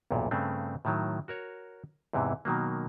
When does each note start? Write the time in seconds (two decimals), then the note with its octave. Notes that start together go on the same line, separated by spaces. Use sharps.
0.11 B1 E2 G2 A#2
0.31 G2 C#3 A3 C4 D4
0.85 A2 D#3 F#3
1.28 F#4 A#4 C#5
2.13 E2 G#2 C3 E3
2.45 B2 D#3 F#3 A#3